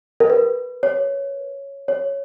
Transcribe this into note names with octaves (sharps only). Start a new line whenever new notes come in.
A#4
B4
C#5
C#5